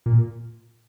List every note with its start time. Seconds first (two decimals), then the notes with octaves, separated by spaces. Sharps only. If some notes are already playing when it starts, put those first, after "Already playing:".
0.06 A#2